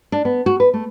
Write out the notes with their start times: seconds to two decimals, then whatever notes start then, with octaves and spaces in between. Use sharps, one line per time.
0.12 D4
0.25 B3
0.46 F#4
0.60 B4
0.74 A3